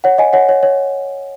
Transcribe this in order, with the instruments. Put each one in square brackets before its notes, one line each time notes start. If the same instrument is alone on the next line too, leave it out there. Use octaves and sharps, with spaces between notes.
[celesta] C#5 F#5
D#5 G#5
C#5 F#5
C#5
C#5